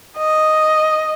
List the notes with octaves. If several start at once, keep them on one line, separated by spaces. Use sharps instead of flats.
D#5